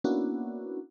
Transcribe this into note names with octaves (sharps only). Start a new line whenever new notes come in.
A#3 B3 C#4 D4 E4 F#4